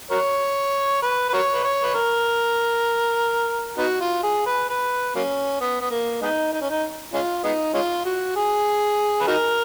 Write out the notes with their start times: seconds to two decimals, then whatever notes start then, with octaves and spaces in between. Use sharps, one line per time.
0.11 F#4 A#4 C#5
1.02 B4
1.29 B4
1.33 F#4 A#4 C#5
1.54 B4
1.64 C#5
1.83 B4
1.94 A#4
3.78 B3 D#4 F#4
4.00 F4
4.23 G#4
4.46 B4
4.69 B4
5.15 F#3 A#3 C#4
5.61 B3
5.81 B3
5.91 A#3
6.22 G#3 B3 D#4
6.52 D#4
6.61 C#4
6.70 D#4
7.14 G#3 C#4 F4
7.44 G#3 B3 D#4
7.74 G#3 C#4 F4
8.05 F#4
8.36 G#4
9.21 B4
9.27 D#4 F#4 A#4